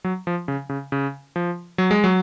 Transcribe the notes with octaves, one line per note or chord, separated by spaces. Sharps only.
F#3
F3
C#3
C#3
C#3
F3
F#3
G#3
F#3